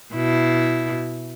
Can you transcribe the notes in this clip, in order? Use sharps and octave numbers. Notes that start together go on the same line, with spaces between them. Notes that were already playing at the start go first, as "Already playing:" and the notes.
B2 E4